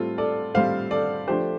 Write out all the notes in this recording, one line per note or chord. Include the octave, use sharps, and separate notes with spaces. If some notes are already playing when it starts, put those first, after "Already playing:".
Already playing: A2 G3 C4 F4 A4
A4 D5
A2 G3 C4 C5 F5
A4 D5
F3 A3 D4 G4 C5